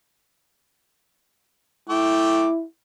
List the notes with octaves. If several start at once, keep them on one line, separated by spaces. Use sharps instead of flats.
A3 E4 G5 D6